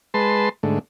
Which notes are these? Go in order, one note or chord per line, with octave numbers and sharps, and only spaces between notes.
G#3 B4 A5 C6
G#2 D3 A3